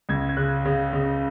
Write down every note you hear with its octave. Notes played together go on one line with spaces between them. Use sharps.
C#2 G#6
G#6
C#3 F#6
C#3
C#3